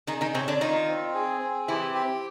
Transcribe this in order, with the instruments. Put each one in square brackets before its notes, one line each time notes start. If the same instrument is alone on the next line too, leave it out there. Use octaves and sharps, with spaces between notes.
[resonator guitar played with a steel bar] D#3 D#4 [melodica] G#4
[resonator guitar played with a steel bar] D#3 D#4
[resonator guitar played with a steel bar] C3 C4 [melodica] C#5
[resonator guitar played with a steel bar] D3 D4
[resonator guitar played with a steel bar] D#3 D#4 [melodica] F4
[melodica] C4
G#4
C4
[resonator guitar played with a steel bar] E3 E4 [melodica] G4
[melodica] G4